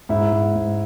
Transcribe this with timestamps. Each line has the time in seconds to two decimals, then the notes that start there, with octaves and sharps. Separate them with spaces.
0.09 G#2 E4
0.32 G#2
0.55 G#2